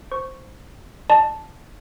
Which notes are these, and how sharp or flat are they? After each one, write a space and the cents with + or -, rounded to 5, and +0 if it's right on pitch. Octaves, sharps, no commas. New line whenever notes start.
C5 +0 C#6 +0
D#5 -40 A5 -5